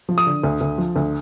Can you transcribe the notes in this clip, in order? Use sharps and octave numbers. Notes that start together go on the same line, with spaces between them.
F3
D#6
D3
D2
D2
F3
D2